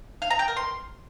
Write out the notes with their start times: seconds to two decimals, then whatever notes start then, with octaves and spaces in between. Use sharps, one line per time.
0.22 F5
0.30 A#5
0.39 G5
0.48 A#4
0.57 C6